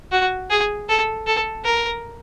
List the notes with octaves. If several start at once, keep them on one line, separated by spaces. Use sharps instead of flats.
F#4
G#4
A4
A4
A#4